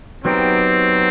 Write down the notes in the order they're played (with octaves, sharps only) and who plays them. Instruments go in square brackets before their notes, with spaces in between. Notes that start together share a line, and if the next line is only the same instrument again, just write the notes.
[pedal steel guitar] F#3 B3 D#4 G4 A#4 [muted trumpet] C4